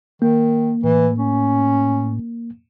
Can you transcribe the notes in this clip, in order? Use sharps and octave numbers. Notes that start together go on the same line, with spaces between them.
D#3 A#3
A2 E3
C#4